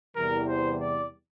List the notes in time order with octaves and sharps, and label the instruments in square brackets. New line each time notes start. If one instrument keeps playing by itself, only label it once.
[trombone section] E2 C3 E3 G3 [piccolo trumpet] A#4
[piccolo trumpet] C5
D5